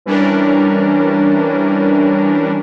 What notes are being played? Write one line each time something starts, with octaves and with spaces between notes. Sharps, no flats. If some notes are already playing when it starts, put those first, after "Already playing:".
E3 G3 C#4 D4 A#4